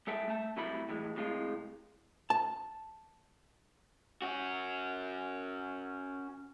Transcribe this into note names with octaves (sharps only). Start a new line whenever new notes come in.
G#3 A4 E5 G5 A5
A3 E5 A5
C3 F#3 G3 A3 E4 B5
A2 E3 G#3
A2 C3 G#3 F4
A5
C#4 F#4